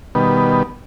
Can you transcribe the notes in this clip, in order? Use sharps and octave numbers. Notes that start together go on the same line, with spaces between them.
B2 D#3 G3 B3